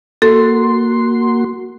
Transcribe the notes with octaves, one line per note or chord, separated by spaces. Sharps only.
A#3 F#4 A4 C6